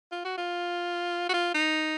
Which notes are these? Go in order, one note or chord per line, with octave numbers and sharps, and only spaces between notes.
F4
F#4
F4
F#4
F4
D#4